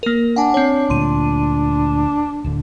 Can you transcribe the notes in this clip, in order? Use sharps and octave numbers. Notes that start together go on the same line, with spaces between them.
A#3 A#4
D4 F#5 G#5
C4 C#5
D2 A#2 C6 D#7
D1 D3